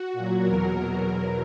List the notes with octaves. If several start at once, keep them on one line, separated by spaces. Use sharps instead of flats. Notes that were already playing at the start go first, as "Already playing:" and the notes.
Already playing: F#4
A#2
F#3
E2 B2 F#3 A#4